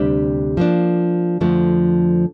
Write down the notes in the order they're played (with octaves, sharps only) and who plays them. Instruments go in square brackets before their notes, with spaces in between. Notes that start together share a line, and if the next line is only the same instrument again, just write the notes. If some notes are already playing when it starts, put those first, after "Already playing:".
Already playing: [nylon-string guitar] D2 C3 G3 D4 G4
F3 A#3 D4
F2 D3 F3 A3